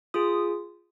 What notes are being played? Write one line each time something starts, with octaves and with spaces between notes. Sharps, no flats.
F4 G#4 D#6